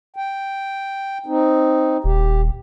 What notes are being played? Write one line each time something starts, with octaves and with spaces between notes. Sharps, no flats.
G5
C4 D#4
D#1 G4